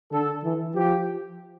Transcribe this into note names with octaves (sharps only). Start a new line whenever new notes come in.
D3 A4
E3
F3 G4